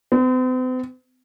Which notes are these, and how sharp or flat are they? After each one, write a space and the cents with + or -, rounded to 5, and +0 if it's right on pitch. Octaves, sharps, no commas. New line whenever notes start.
C4 -45